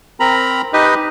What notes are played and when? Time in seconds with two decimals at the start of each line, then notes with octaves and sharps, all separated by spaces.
0.20 C4 A#4 A#5 B5
0.73 D#4 G4 B4 D#5